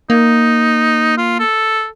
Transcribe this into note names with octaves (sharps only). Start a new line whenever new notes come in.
A#3 D#4
F4
A4